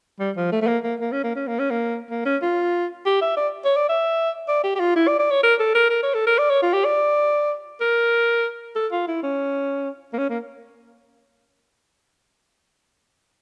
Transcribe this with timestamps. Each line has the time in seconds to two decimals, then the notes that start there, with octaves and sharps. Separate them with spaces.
0.20 G3
0.37 F3
0.52 A3
0.62 A3
0.67 A#3
0.84 A#3
1.00 A#3
1.12 C#4
1.24 A#3
1.36 C#4
1.47 A#3
1.59 C#4
1.70 A#3
2.11 A#3
2.26 C#4
2.42 F4
3.06 G4
3.22 E5
3.37 D5
3.65 C#5
3.77 D5
3.89 E5
4.48 D5
4.64 G4
4.75 G4
4.80 F4
4.96 E4
5.08 D5
5.19 D5
5.31 C#5
5.43 A#4
5.60 A4
5.75 A#4
5.90 A#4
6.03 C#5
6.14 A4
6.27 A#4
6.38 D5
6.50 C#5
6.62 F4
6.74 G4
6.85 D5
7.81 A#4
8.76 A4
8.92 F4
9.08 E4
9.23 C#4
10.13 A#3
10.18 C#4
10.30 A#3